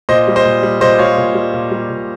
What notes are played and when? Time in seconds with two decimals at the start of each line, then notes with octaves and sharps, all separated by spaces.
0.09 A#2 C5 D#5
0.28 G3
0.36 C5 D#5
0.45 A#2
0.63 G3
0.81 A#2 C5 D#5
0.99 G3 C#5 F5
1.18 A#2
1.35 G3
1.54 A#2
1.71 G3
1.90 A#2